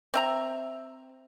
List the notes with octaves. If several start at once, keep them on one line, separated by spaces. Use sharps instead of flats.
C4 E5 A#5